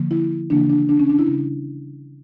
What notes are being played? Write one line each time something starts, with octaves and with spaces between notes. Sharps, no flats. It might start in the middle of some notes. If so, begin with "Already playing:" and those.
Already playing: D3 F3 A#3
E4
C#3 E3 A#3 D4
D4
D4
C#4
D4
E4
C#3 G3